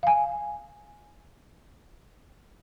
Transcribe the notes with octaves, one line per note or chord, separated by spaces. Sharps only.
F5 G#5